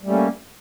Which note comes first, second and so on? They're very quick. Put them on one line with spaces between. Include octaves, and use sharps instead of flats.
G3 A3 C#4 A#3